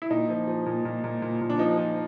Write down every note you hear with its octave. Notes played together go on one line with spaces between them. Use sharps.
E4
A#2 D#4
F3
F3
A#2
A#2
A#2
A#2
A#2
D4
F3 D#4
F3